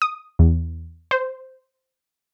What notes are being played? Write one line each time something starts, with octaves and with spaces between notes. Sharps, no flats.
D#6
E2
C5